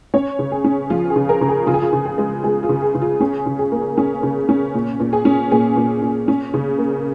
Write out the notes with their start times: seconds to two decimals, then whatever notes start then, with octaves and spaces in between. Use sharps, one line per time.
0.14 C#4 C#5
0.39 C#3
0.52 G#4
0.64 C#4
0.90 F3 F4
1.10 G#4
1.16 C#3
1.29 A#4
1.41 C#3
1.49 G#4
1.67 C#3 F4
1.74 G#4
1.82 F4
1.93 C#3
2.06 G#4
2.18 G#3
2.44 G#3 G#4
2.63 F4
2.69 C#3
2.82 G#4
2.95 C#3
3.02 F4
3.20 C#4 G#4
3.46 C#3
3.59 G#4
3.72 A#3
3.97 C#4 G#4
4.23 C#3
4.49 C#4
4.74 A#2
5.00 A#2
5.13 G#4
5.25 C#4
5.52 A#2 G#4
5.77 A#2
6.02 A#2
6.28 C#4
6.54 C#3
6.79 A#3